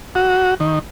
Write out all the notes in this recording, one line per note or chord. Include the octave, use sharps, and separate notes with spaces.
F#4
D#3